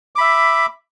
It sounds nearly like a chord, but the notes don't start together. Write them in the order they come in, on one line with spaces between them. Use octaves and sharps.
D6 B5 E5